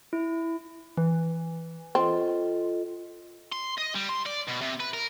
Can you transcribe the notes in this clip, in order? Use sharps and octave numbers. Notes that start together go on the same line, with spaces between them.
E4
E3
C4 F4 A4 D#5
C6
D#5
G3
C6
D5
B2
C3
B4
A#4